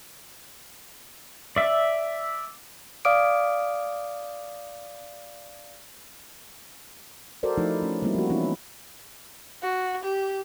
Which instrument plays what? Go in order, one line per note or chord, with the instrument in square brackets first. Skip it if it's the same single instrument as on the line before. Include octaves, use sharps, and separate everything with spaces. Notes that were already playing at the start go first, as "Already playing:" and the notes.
[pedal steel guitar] D5 E5
[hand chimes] D5 F5 D6 D#6 F6 D7
[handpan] F#4 A4 A#4 C5 D5
F3 A3 D#4 E4
A3 C#4
G3 A3 A#3 C4 E4
F3 F#4
E3 B3 C#4 D#4 E4
[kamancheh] F#4
G4